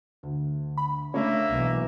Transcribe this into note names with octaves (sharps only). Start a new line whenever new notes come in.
D2
B5
C#3 A3 A#3 D4 C#5 E5
B1 E3